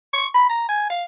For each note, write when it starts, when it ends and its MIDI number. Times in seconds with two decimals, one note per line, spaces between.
0.13 0.27 85
0.34 0.49 83
0.49 0.65 82
0.69 0.86 80
0.90 1.04 77